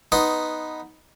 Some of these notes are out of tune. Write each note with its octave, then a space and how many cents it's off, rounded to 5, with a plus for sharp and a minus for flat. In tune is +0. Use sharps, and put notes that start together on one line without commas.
B3 +0 D#4 +0 C6 +0